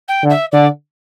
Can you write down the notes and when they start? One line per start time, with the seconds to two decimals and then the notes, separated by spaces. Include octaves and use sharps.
0.08 G5
0.23 D3
0.30 E5
0.52 D3 D5